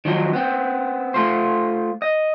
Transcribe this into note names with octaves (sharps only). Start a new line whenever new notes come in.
D#3 F3 F#3 D#4
B3 C4
A3 F4 C5
D#5